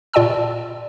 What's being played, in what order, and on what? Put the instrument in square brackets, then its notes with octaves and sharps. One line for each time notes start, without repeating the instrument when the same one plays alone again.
[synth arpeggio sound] A#2 F4 D5 G5 A5 E6